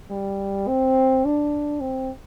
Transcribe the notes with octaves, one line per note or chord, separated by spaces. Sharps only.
G3
C4
D4
C4